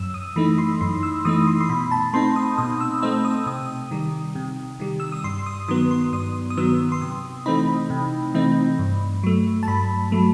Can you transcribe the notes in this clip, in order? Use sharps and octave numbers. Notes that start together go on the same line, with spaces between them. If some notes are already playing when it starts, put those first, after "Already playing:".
Already playing: F#2 E6
D#6
E3 A3 D#4 B5
C6
F#2 C6
E6
E3 A3 D#4 D#6
C6
C6
B2 B5
A5
A3 C4 D#4 C6
D#6
B2 D#6
E6
A3 C4 D#4 E6
D#6
C3 D#6
D#3 G3
C3
D#3 G3
E6
D#6
G2 C6
D#6
D#3 F#3 B3 D#6
C6
G2 D#6
D#6
D#3 F#3 B3 E6
C6
C3 D#6
E3 A3 C4 D#4 B5
C3
E3 A3 C4 D#4
G2
F#3 A3
A5
G2 B5
F#3 A3